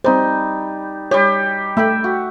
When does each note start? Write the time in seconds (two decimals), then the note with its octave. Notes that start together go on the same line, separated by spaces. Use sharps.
0.04 G3 C4 D#4 C5
1.11 G3 G4 C#5
1.77 A3 E5 G5 B5
2.04 F#4